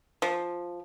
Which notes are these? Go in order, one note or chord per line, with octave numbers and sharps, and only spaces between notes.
F3